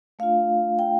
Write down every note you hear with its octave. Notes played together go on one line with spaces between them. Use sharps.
A3 D4 F4 F5
G5